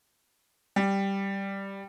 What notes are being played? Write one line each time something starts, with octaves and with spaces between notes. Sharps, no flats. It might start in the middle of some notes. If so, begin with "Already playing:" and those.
G3